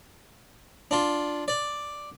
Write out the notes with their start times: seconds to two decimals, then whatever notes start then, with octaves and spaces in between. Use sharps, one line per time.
0.91 D4 F4
1.48 D5